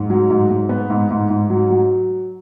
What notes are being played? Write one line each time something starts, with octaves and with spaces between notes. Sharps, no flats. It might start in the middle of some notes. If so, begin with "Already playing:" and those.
Already playing: G#2
F#3
G#2
G#2
B3
G#2
G#2
G#2
F#3
F#3